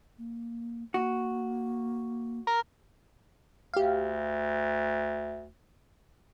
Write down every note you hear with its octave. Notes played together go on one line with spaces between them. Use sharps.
A#3
A#3 F#4
A#4
D2 G4 F5